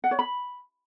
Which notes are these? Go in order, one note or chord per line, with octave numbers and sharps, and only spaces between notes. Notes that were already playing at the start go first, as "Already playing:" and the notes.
F#5
C#5
B5